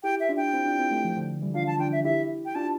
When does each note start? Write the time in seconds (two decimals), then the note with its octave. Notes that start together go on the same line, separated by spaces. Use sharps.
0.03 E4 G4 G5
0.20 E5
0.29 D4 F4
0.37 G5
0.53 C4 E4
0.66 D4 F4
0.79 C4 E4
0.91 A3 C4
1.04 F3 A3
1.16 D3 F3
1.41 E3 G3
1.54 D4 F4 F5
1.67 A5
1.79 D4 F4 G5
1.92 E5
2.04 E4 G4 E5
2.45 G5
2.55 D4 F4 A5